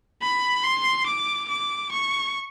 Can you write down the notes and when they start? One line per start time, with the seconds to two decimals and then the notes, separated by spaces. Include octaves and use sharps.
0.22 B5
0.64 C6
1.06 D6
1.49 D6
1.92 C#6